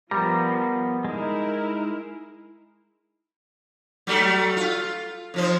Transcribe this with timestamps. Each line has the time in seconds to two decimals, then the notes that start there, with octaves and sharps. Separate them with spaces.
0.11 F3 G3 B3 A#4 A#5
1.04 G#3 D#4 E4 A#4
4.07 F#3 G3 A3
4.57 F4
5.34 F2 F3 C5